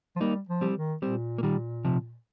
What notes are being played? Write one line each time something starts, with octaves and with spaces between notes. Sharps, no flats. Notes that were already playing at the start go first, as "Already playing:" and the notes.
F3
G3 A#3 D#4
F3
G3 C4
D#3
A#2 G3 C4
A#3
D#3 G3
C3 F3